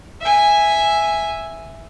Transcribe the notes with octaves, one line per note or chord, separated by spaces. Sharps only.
E5 G#5